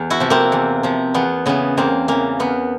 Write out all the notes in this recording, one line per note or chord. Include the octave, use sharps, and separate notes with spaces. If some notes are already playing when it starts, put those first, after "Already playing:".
Already playing: E2
E4 F#4
C3 F3
A#3 C4
E2
C3 F3
E2 B3
C#3 E3 B3
E2 A#3 C4
C#3 E3 A#3
E2 B3